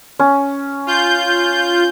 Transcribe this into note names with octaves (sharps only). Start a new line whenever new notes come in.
C#4
F4 G6